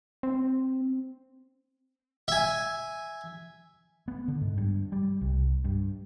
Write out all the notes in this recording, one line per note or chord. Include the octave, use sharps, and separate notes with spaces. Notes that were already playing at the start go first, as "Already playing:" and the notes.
C4
E5 G#5
B3
D3
G#2
G2
G3
C2
G2